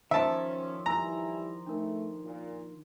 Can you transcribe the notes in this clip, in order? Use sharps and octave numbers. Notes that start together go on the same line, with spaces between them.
D#3 F3 C#4 C5 E5 A5
E3 G3 E4 G#5 A#5 E6
A3 D4 D#4 A#4
A#2 F4